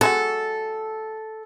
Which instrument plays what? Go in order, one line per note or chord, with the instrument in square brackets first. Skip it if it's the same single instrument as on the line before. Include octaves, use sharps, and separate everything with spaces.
[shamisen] F#3 G#3 F#4 [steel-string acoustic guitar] A4